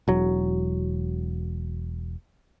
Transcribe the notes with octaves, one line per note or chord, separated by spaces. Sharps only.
E1 F#3